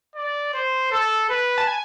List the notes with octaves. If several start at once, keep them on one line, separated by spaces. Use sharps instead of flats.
D5
C5
A4
B4
A5
G#5